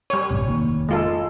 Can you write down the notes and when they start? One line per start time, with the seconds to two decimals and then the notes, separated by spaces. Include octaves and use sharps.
0.10 G3 C#5
0.31 A1 G2 C3
0.46 F1 D#3 A#3
0.89 G#3 F4 A4